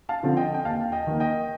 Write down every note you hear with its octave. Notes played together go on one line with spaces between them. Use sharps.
F5 A5
D3 F3 C4
D#5 G5
G5
D#2 F5 A5
D#5 G5
D#3 A#3
D#5 G5